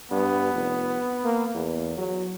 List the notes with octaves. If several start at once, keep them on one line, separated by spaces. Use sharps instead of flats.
G2 B3
F1
A#3
E2
F#3